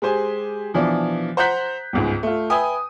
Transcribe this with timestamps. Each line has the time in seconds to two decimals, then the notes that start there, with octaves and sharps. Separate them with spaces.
0.02 G#3 G4 C5 G#5
0.74 B2 E3 F3 D4
1.37 C5 F#5 A#5 F#6 G6 B6
1.93 G1 C#2 G#2
2.23 A3 F4
2.50 B4 E5 G5 G#5 D#6